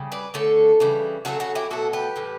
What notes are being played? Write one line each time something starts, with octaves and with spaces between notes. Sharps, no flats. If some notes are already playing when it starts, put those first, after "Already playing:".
Already playing: C#3 G3
B4 D5
D3 A3 A4 C#5
C#3 E3 G3
C#3 F#3 A3 F#4 A4
F#4 A4
E4 G4
B2 F#3 A3 F#4 A4
G4 B4
A2 E3 G3